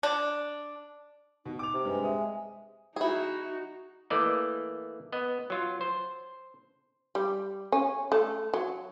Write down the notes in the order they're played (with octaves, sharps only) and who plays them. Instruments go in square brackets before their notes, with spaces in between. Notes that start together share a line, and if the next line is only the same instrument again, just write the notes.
[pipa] D4
[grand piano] B2 [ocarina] D#4
[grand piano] D6 F7
[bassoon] C3
[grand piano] G2 [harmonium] G#3 [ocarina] B4
[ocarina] E5 [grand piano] D#6
[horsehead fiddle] D#4 F#4 [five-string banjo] E4 G#4
[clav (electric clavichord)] E3 A3 A#3 D5 D#5
B3 D#5
F#3 F4
C5
[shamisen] G3
C#4
A3
F#3